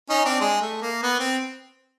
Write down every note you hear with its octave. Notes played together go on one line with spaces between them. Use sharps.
C#4 D#4
C4 D4
G#3
A3
A#3
B3
C4